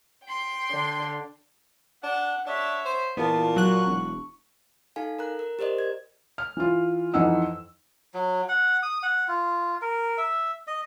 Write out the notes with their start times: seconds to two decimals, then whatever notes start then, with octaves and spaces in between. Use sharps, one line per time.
0.24 G5 C6
0.71 D3
2.03 D4 F#5
2.47 D4 C#5 E5
2.85 C5
3.17 E2 A#2 B3 F4 A5
3.56 F#3 C#6 F#6
3.86 E1
4.96 D#4 A4 F5 G#5
5.18 A#4 A#5 F#6
5.39 A#4
5.59 G4 A#4 C5 D5 D#5
5.78 G#6
6.38 F6
6.57 E3 F4
7.14 F2 E3 D#4 F#5 E6
8.14 F#3
8.49 F#5
8.83 D#6
9.03 F#5
9.28 F4
9.82 A#4
10.18 E5
10.67 D#5